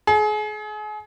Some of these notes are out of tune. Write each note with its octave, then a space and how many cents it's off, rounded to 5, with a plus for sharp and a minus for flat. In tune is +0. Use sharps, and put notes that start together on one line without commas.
G#4 +35